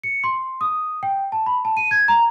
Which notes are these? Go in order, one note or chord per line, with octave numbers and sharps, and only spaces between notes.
C#7
C6
D#6
G5
A5
B5
A5
D#7
G#6
A#5